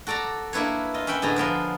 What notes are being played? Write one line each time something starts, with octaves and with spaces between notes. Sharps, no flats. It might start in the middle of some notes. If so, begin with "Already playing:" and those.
F#4 A4 D5 A5 A#5
A#3 D4 E4 B4 C#5
F4 D#5
C#4 E5 F#5 G5 B5
A2 D3 B3 G#4 A#5
F3 B3 A#4 C5